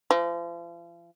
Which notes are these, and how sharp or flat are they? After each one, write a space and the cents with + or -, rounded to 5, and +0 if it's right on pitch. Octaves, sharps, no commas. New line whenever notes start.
F3 -40